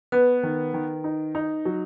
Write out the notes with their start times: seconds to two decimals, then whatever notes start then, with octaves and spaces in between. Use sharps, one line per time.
0.12 B3 B4
0.43 D#3
0.74 D#3
1.04 D#4
1.35 D#4
1.65 F#3